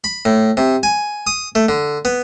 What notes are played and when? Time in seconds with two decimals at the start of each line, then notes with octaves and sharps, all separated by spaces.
0.04 B5
0.25 A2
0.57 C3
0.83 G#5
1.27 D#6
1.55 A3
1.69 D3
2.05 B3